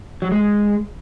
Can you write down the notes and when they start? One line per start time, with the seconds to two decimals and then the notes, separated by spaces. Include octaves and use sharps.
0.22 F#3
0.32 G#3